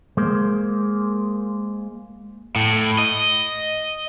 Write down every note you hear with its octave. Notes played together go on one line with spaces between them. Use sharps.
G#3 A#3 C5
A2
D#5